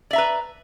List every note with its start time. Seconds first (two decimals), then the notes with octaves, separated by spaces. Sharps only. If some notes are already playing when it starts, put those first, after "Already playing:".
0.11 D5
0.13 E5
0.16 A#5
0.18 B4